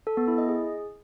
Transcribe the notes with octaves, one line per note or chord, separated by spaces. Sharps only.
A4
B3
E4
D#5
G#4